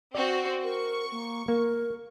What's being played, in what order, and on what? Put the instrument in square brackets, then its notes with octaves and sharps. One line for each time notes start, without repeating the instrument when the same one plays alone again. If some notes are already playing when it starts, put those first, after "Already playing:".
[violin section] C4 F#4 [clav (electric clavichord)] D5
[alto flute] A#4 [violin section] C#6
[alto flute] A#3
[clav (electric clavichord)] A#3 [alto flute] A#4